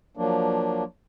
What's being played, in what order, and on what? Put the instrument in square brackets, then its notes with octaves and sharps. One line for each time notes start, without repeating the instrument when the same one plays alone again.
[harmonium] F3 F#3 A#3 D4